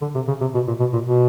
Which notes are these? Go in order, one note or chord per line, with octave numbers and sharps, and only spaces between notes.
D3
C3
C#3
C3
B2
A#2
B2
A#2
B2